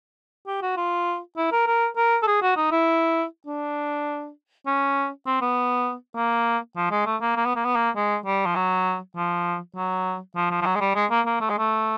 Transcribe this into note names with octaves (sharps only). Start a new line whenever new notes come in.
G4
F#4
F4
E4
A#4
A#4
A#4
A4
G#4
F#4
D#4
E4
D4
C#4
C4
B3
A#3
F3
G#3
A3
A#3
A#3
B3
A#3
B3
A#3
G#3
G3
F3
F#3
F3
F#3
F3
F3
F3
F#3
G#3
G3
G#3
A#3
A#3
A3
G#3
A3